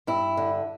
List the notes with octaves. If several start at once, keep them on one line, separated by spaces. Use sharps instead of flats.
G2 E4
D3